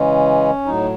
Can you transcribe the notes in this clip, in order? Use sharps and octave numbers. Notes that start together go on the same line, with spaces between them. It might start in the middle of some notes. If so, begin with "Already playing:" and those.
Already playing: C#3 E3 G#3 C#4
A2 F#3 D#4